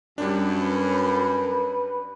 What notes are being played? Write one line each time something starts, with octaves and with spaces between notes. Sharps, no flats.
F#2 G3 D4
B4